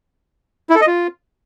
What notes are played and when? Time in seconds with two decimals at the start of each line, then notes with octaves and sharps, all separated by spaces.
0.70 E4
0.75 A4
0.81 D#5
0.87 F4